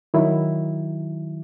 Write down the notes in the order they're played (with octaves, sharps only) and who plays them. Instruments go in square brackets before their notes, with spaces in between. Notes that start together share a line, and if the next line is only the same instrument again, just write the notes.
[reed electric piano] D#3 F#3 E4